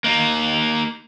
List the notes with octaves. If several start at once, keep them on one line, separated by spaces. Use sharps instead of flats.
A#3 D#4